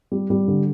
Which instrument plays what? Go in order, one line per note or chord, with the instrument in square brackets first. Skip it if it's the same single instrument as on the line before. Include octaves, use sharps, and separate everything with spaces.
[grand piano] G3
G3
D3